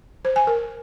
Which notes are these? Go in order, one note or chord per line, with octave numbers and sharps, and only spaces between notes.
C5
G#5
A#4